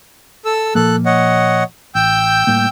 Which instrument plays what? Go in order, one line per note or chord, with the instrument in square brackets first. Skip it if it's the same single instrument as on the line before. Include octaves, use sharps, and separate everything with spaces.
[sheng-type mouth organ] A4 E6
[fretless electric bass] A#2 F3 A#3 [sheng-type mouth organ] A4 F#6
[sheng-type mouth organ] C#5 D#5 F#5
[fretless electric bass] A1 [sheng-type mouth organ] G5 E6 G6
[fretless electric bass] A2 G3 A#3